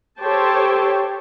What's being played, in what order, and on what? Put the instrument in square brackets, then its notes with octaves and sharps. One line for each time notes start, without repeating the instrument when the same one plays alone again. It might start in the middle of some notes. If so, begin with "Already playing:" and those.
[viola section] G4 A4 C5 C#5 G5 A5